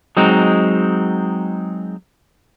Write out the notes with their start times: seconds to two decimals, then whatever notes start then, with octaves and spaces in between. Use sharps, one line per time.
0.17 F#3 G#3 C4 D#4